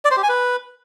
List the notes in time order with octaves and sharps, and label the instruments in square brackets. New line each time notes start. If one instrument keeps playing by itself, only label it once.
[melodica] D5
C5
G4
G#5
B4